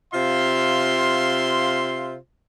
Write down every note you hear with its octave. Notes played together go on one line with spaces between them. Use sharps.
C3 F4 C5 E5 F5 C6